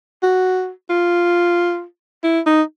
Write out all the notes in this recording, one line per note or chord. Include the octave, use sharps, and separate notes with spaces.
F#4
F4
E4
D#4